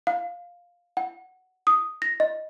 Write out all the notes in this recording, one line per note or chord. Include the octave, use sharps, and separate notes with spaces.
F5
F#5
D#6
A#6
D#5